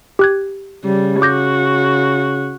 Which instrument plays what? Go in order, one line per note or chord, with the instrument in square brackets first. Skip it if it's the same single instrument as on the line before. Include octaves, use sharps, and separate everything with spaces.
[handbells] G4 F#6 G#6
[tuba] C#3 [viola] G3
[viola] F#4 [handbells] D6 G6 A#6